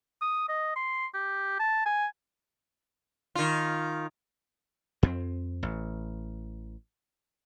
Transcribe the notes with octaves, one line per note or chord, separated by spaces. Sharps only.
D#6
D#5
C6
G4
A5
G#5
D#3 F4
F2 A#3 C4
A1